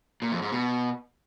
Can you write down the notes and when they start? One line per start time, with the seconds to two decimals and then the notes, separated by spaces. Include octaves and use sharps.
0.22 A#2
0.32 F2
0.42 G#2
0.52 B2